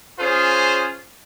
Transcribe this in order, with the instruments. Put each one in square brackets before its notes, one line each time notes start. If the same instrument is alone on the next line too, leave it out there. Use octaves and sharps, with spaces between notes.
[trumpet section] C#4 F4 G#4 C5